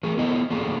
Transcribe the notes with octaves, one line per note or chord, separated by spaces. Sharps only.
A3 G#4 A#4
B3 E4 A4 D#5
A3 A#3 C#4 F#4 G#4 A4